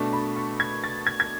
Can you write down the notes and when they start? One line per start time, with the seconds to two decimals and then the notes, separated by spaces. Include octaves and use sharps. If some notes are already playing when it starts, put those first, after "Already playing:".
Already playing: B2 A3 D4 A5
0.13 B5
0.36 C#6
0.60 G#6
0.84 A6
1.07 G#6
1.20 G#6